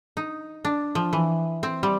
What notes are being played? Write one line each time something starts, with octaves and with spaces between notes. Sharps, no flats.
D#4
D4
F3
E3
C4
G3